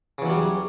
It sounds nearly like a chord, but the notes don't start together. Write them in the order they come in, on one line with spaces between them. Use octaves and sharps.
C#3 E2 F#3 G3